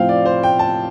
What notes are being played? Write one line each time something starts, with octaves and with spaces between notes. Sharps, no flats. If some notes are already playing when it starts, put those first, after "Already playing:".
Already playing: A2 F3 C4 F5 G5
D5
C5
G5
A5